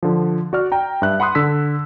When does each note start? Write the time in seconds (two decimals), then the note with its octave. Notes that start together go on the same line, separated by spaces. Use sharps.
0.03 D3 F3
0.53 F#4 D5 F6
0.72 G5 A#5
1.02 G2 E5 F#6
1.20 F#5 B5 C6 D#6 F#6
1.35 D3 E6 B6